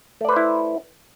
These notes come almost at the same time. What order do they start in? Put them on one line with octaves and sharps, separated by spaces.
A3 D5 B4 C5 E4